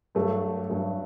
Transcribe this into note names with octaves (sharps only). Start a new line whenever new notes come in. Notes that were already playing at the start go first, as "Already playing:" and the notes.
G2 F#3 A3
G2 F#3 A3